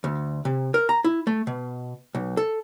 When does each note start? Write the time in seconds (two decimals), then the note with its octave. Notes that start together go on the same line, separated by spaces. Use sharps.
0.04 D2
0.45 C3
0.74 A#4
0.89 A#5
1.04 E4
1.27 A3
1.47 B2
2.15 B1
2.37 A4